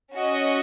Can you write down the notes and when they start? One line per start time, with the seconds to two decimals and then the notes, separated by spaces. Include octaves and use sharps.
0.14 C#4 F#4 D#5